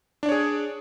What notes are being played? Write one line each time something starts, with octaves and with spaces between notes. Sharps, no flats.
D4 G#4 C#5 D5